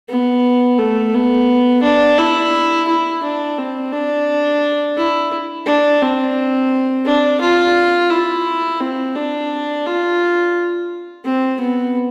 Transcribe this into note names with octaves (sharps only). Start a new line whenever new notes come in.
B3
A3
B3
D4
E4
E4
D4
C4
D4
E4
D4
C4
D4
F4
E4
C4
D4
F4
C4
B3